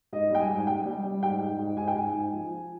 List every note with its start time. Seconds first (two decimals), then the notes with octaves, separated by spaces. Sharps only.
0.13 G#2 D#5
0.31 G3 G5
0.39 G#5
0.49 G#2
0.67 G3 G5
0.86 G3
1.04 G3
1.22 G#2 G5
1.41 G#2
1.59 G#2
1.77 G#2 G#5
1.88 G5
1.96 G#2 G#5
2.14 G#2
2.33 F3
2.50 F3